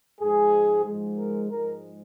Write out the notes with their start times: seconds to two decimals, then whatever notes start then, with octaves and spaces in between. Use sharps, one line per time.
0.20 G#2 F3 G#3 G#4
0.85 G#2 F3 G#3
1.17 A#4
1.50 G#2 F3 G#3 A#4